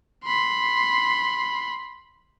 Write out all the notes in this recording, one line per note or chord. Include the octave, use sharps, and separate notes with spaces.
B5 C6